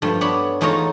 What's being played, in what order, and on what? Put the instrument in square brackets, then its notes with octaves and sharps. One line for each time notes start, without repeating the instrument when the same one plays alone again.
[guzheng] G2 F3 A3 C6
B3 D4 B4 C#5 B5
E2 A3 D#4 F4 C#5 A#5